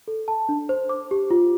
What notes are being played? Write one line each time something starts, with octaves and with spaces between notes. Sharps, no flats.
A4
A5
D4
C5
D6
G4
F4